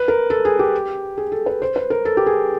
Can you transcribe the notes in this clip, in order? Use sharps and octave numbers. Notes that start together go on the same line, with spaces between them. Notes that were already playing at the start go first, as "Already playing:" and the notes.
Already playing: B4
A#4
A4
G#4
G4
G#4
A4
B4
C5
B4
A#4
A4
G4
G#4